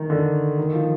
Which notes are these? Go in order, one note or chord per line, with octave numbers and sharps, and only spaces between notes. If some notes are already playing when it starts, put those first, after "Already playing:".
Already playing: D#3
D3
D#3
F3